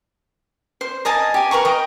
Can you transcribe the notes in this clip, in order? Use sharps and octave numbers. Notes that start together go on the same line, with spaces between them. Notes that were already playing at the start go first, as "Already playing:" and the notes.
C5
A#4 D#5 G#5 A5
G4 G#5
A#4 B4 A#5 C#6
D#5 G5